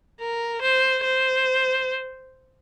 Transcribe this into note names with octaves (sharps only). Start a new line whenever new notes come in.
A#4
C5
C5